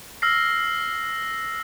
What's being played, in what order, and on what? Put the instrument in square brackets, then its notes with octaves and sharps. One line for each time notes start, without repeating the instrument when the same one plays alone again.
[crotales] E6 F6 A#6 C7